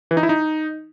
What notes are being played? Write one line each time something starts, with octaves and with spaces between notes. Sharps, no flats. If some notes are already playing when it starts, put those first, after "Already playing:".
E3
D#4
E4
D#4